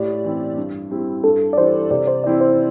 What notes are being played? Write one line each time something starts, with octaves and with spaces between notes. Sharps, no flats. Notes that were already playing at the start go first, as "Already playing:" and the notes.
Already playing: A2 G4 D5
E3 C4 E4
G2
G3 C4 E4
G2 A4
D5
E3 G3 D4 C5
C3 D5
C5
E3 C4 E4 D5
C5